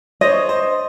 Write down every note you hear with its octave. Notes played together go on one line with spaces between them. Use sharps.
D4 C5 C#5 D#5
C5